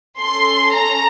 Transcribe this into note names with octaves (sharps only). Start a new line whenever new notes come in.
C#4 A4 C6
A#5